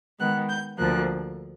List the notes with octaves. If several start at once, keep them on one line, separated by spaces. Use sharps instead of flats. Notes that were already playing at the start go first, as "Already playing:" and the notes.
D#3 G#3 B3 F#6
G6
D2 D3 F3 A#3 F#6